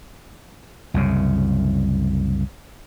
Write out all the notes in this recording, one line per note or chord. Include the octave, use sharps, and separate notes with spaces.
C2 F#2 C#3